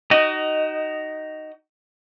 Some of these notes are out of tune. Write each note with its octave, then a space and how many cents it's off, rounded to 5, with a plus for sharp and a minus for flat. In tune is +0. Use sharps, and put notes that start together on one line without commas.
D#4 +0 F#4 +35 D#5 +0